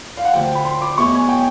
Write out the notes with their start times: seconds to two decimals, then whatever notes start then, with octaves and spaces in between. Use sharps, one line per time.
0.17 F5
0.25 F#5
0.34 D2 D3 F3 G5
0.55 B5
0.65 C6
0.81 D6
0.98 E2 B2 F#3 A3 C#4 C#6
1.14 G#5
1.29 G5